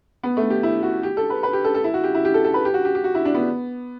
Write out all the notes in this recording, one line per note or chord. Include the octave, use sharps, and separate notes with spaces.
B3
A3
G4
E4
F#4
G4
A4
B4
B4
G4
A4
A4
E4
F#4
G4
E4
G4
A4
A4
B4
G4
F#4
G4
G4
F#4
E4
D4
B3